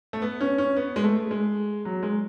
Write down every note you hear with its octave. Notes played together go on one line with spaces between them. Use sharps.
A3
B3
C#4
C#4
B3
G#3
A3
G#3
F#3
G#3